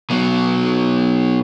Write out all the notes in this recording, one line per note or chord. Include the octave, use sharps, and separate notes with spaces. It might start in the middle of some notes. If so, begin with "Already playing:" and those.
B2 F#3